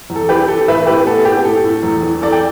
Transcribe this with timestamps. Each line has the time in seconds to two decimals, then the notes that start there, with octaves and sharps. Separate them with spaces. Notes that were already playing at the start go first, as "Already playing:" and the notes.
0.10 E2
0.16 A4
0.29 E3 G4 B4
0.48 E3 A4
0.68 A2 B4 E5
0.86 A2 G4 B4
1.06 B3 A4
1.25 A2 G4
1.45 A2 A4
1.64 A2
1.83 E2
2.03 E3
2.22 E2 A4 D5
2.32 G5